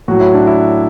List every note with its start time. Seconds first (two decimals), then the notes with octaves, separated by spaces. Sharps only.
0.08 A2 F#3 F#4
0.20 E4
0.34 D4
0.47 E4